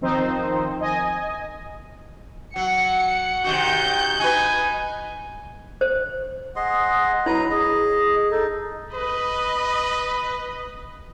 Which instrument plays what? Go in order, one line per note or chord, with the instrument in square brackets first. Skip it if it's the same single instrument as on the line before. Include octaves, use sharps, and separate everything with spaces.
[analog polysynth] D#3 F3 C4 D#4 C5
D#5 G#5
[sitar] F#3 [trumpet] F#5 [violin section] C#7
[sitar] C3 D#3 F#4 [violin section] G6
[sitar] D#4 F#4 B4 [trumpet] G#5
[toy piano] C5
[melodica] G#4 D#5 C6 [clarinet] F#5
[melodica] F#3 B4 A#5 [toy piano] E4
[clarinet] G#4 [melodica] D#5
[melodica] D#4 [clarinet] A4
[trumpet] B4 [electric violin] D#5 B5